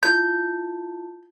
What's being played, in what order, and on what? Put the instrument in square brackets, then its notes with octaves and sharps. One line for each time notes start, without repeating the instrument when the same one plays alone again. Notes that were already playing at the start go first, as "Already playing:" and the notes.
[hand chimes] E4 F4 A5 [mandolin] G6